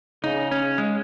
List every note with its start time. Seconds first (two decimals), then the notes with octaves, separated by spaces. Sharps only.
0.24 C#3 D#4
0.51 C#4
0.78 G#3